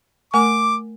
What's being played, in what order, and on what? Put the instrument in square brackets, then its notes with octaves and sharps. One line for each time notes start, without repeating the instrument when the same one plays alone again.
[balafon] A3 A#4 G#5 [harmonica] D6